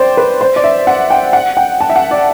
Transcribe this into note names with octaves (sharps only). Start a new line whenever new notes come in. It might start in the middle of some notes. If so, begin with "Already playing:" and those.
Already playing: C5 D5 G5
B4
C5
D5
E5
F#5
G5
F#5
G5
A5
E5
F#5
D5